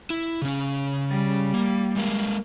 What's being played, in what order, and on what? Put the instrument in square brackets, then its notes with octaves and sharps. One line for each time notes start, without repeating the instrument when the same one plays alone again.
[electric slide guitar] E4
C#3 C#4
[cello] G3
[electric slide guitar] A#3
G#3 A#3 F5